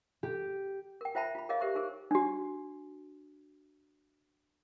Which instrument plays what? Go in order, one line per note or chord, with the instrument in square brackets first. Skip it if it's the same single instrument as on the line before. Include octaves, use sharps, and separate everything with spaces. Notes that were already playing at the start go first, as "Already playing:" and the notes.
[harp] G4
[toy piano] A#4 G5
F4 C5 E5 G5 A5 B5
F4 B5
G#4 A#4 C#5 D#5 F5
G4 A4 A#4 C5 E5 C#6
D#4 G#4 A#4 C5
D4 F#4